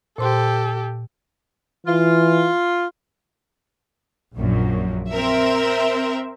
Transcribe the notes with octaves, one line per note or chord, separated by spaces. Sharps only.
A#2 G4 A4 C5 C6
E3 F4
A#1 F#2 A#2
C4 A#4 E5